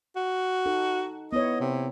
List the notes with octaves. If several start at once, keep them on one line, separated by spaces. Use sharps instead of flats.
F#4
D#4 A4
B3 E4 C#5 D#5
C3